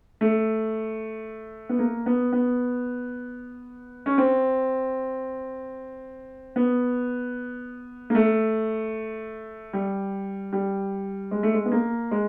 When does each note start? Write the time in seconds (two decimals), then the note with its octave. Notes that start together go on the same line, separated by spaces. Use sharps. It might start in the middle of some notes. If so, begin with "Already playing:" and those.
0.21 A3
1.69 B3
1.79 A#3
2.06 B3
2.33 B3
4.06 C#4
4.18 C4
6.56 B3
8.10 A#3
8.15 A3
9.73 G3
10.53 G3
11.31 G#3
11.43 A3
11.54 G#3
11.65 B3
11.72 A#3
12.11 G#3